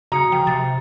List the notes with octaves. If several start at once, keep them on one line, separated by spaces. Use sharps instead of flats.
C#3 F#4 A#5 D#6 C#7
F3 G5
C3 A6